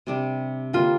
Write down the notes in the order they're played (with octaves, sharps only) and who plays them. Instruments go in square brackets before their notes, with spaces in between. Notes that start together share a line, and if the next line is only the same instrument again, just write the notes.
[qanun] C3 G3 D4
[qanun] D3 G3 A#3 [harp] F4